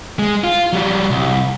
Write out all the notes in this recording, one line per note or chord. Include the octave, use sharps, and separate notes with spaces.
G#3
F4
F#3 G3
C2